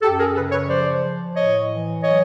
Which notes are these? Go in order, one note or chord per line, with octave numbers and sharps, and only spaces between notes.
F#2 G4 A4
G#4 A#4
C#3 A4 B4
B4 C#5
F3 C5 D5
F3
A2 C#5 D#5
E3
F#3 C#5 D#5